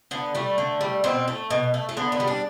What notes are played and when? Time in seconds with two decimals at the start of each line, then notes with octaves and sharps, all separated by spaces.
0.11 D3 B3
0.35 G3 A3
0.58 D3
0.81 G3
1.04 B2 C4
1.28 A3
1.50 B2
1.74 A3
1.89 A3
1.97 D3 B3
2.12 B3
2.20 G3
2.27 D4